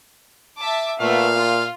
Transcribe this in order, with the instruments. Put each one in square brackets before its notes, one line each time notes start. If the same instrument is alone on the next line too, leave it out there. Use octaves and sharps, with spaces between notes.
[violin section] E5 A5 D6
[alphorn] A#2 [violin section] A3 B3 E5 [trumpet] F5
[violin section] F4